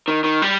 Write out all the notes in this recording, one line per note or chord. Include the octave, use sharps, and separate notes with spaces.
D#3
D#3
G3